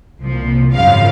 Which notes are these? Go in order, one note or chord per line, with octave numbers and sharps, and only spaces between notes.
C2 A#2 F3
G#1 F#2 C#3 F3 F5